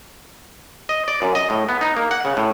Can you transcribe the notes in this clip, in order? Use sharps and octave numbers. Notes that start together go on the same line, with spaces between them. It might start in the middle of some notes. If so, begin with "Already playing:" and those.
D#5
D5
F#2
D#5
A2
B3
D#4
A#3
F#5
C#3
A2